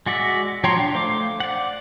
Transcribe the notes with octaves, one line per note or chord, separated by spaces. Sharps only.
G#3 F#4 D5 E5
F3 C#5 G5 A#5 C6
D4
A3 C5 F5 D6
D5 F#5